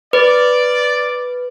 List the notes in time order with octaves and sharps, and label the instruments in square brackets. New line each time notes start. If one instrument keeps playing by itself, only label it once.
[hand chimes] B4 [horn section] D5